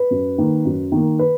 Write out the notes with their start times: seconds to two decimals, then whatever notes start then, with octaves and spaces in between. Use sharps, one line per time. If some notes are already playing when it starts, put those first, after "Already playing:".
Already playing: B4
0.11 F#2
0.38 D#3 A#3
0.65 F#2
0.92 D#3 A#3
1.19 B4